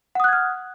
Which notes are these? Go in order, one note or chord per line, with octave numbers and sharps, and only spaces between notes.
F#5 D#6 F6 F#6 G#6